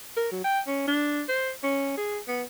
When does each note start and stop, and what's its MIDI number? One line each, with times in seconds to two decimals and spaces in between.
0.17 0.29 70
0.32 0.39 54
0.44 0.60 79
0.67 0.84 61
0.87 1.23 62
1.28 1.51 72
1.63 1.95 61
1.97 2.19 68
2.28 2.43 59